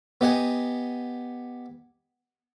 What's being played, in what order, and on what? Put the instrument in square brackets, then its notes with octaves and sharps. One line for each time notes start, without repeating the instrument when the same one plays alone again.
[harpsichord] B3 G4 D#5 F#5 G#5